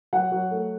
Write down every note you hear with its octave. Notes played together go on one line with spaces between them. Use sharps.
F#3 F#5
F#3
A3